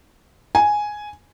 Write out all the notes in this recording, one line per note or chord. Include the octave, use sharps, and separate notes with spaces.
G#5